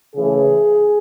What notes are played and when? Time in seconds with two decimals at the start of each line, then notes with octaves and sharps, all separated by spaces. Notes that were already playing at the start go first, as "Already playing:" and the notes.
0.13 C#3 E3 A3 G#4